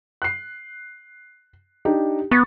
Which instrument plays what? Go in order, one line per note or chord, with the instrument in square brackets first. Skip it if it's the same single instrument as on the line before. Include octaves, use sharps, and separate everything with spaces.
[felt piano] F#6 C7
D4 D#4 G4
[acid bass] B3 [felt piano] C#6 A6